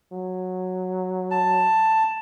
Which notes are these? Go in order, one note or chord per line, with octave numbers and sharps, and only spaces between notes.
F#3
A5